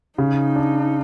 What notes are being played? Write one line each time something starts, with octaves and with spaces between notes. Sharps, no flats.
C#3 D#4
D4